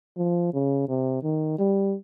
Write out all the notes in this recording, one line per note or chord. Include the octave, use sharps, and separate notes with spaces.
F3
C#3
C3
D#3
G3